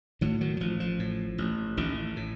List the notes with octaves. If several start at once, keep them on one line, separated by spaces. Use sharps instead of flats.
A2 D#3 F#3
D#3 F#3
F#3
A1 F3
F3
A2
A1
A1 D#3
A2